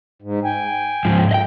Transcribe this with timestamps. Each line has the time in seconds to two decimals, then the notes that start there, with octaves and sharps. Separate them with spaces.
0.22 G#2
0.45 G5 G#5
1.05 G#2 F3
1.31 D#5 G5